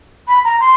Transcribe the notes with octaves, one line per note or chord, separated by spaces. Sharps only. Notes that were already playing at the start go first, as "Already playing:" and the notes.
B5
A#5
C6